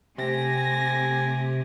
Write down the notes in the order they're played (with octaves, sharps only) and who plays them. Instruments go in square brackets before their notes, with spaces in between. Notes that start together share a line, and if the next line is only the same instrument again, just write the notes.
[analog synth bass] C3 [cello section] A3 C4 G4 [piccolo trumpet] G#5 [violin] A#6